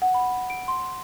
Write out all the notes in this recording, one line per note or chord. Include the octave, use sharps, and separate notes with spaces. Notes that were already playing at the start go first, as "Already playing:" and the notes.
F#5
B5
D7
C6